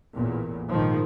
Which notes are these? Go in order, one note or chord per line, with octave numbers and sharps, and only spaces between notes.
A1 E2 A#2
A#1 G#2 D#3 F3